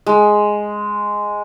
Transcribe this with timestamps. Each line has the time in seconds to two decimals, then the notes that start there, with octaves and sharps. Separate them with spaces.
0.06 G#3